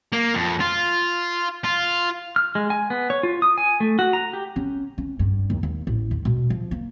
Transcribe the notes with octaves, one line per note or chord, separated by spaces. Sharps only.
A#3
F2
F4
F4
F6
G#3
G#5
B3
C#5
F4
D#6
G#5
A3
F#4
A#5
G4
C#4
C#4
G2
D#2
D#2
A1
D#2
B2
F3
A#3